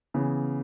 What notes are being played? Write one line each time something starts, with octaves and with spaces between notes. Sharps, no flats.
C#3 E3 B3